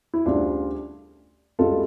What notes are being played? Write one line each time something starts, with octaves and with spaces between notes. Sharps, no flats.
E4
D2 C#3 G3 D4 F4
C#2 C#3 G3 F4 A4